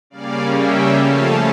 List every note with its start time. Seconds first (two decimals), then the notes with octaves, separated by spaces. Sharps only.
0.10 C#3 G3 A#3 C#4 D5 F5
0.56 E5 G5
1.00 C#3 F3 A3 C#4 F5 A5